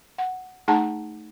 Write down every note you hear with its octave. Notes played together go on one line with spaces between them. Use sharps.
F#5
A3 D#4 G#4 F#5 A5 A#5